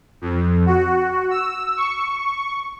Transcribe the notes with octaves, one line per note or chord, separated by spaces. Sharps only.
F2
F#4
E6
C#6